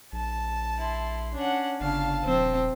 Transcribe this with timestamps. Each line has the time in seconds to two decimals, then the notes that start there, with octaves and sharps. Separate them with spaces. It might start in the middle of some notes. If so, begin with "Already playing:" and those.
0.13 A#1 A5
0.78 E4 C6
1.35 C#4 D4 F#5
1.81 G1 C#3 D4 F5 A5
2.25 D#1 F3 C4